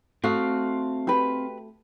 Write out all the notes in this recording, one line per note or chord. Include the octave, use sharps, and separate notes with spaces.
A3 C4 F#4 F5 D#6
G4 B4